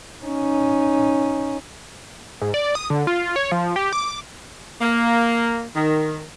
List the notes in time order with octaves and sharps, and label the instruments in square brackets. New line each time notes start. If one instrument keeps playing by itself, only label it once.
[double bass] C#4 D#4
[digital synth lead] G#2
D5
D#6
D3
F4
C#5
F3
G4
D6
[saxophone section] A#3
D#3